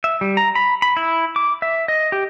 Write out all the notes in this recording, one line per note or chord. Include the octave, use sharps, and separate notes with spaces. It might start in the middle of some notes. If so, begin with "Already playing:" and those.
E5
G3
A#5
B5
B5
E4
D6
E5
D#5
G4